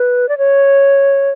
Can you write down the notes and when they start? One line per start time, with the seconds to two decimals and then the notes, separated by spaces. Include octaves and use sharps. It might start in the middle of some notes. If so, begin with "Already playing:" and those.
Already playing: B4
0.29 D5
0.38 C#5